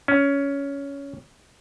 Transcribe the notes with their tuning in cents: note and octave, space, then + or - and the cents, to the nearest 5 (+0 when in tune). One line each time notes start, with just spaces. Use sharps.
C#4 +15